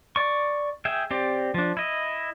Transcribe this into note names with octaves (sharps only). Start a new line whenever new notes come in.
D5 C#6
G#4 E5 G5
C4 G4 D5
F3 D4
E4 D#5